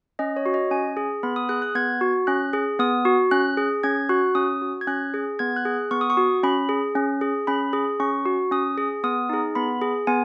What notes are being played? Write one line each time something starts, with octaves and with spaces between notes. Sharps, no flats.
C#4 D#5
C#5
F#4
D#5
C#4 G#5
G#4
B3 B5
D#6
G#4 F#6
F#6
B3 G#6
F#4
C#4 F#6
G#4
B3 D#6
F#4
C#4 F#6
G#4
C#4 G#6
F#4 F#6
C#4 D#6
F#4
G#6
C#4 F#6
G#4
B3 G#6
F#6
G#4
B3 C#6
D#6
C#6
F#4
C#4 B5
G#4
C#4
G#4
C#4 B5
G#4
C#4 C#6
F#4
C#4 D#6
G#4
B3 D#6
D#4 G#4
B3 B5
G#4
B3 G#5